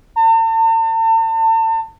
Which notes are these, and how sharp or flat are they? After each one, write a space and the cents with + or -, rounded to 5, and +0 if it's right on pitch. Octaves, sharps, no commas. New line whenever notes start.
A5 +40